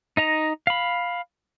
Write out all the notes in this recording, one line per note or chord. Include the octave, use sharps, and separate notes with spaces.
D#4 D#5 A#5
F5 B5